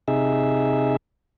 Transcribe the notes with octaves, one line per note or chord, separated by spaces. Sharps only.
C3 D#4 G#4 E5